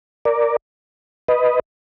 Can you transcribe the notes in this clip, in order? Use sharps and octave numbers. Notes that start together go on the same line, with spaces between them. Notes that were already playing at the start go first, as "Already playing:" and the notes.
A#4 D5
B4 D#5